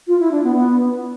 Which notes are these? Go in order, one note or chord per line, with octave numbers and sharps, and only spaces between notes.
F4
E4
D4
B3
B3